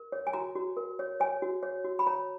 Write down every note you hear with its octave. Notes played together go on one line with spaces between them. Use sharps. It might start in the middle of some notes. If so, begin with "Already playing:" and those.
Already playing: A#4
C#5
G#5
F#4 A#5
F#4
A#4
C#5
C#5 G#5
F#4
C#5
F#4
B5
C#5 A#5